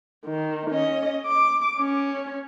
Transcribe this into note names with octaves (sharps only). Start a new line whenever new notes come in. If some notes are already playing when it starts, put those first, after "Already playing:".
D#3
C#4 D#5
D6
C#4